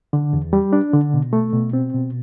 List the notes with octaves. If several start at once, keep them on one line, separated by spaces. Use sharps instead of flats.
D3
E2
G3
D4
D3
B2
A3
B2
C4
B2